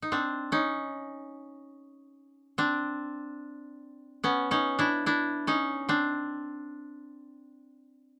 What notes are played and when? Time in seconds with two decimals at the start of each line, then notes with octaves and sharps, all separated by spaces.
0.02 D#4
0.12 C4 D4
0.52 C#4 D#4
2.58 C4 D4
4.24 B3 C#4
4.51 C#4 D#4
4.79 D4 E4
5.06 D4 E4
5.47 C#4 D#4
5.89 C4 D4